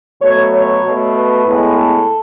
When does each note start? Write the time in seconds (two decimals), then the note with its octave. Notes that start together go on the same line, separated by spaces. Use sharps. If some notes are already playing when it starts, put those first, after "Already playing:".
0.22 B2 F#3 A3 C#5
0.52 C#5
0.84 B2 A3
1.14 B4
1.45 A2 G#3 B3
1.76 A4